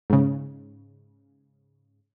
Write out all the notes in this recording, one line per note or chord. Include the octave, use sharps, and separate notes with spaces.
G#2 C#3